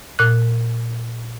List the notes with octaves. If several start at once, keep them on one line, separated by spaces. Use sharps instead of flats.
A#2 F#6